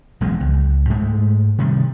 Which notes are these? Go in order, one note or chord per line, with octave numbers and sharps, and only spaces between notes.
E1 B1 F2 G#3
C#2
G#2 G#3 A3
C3 D#3 G3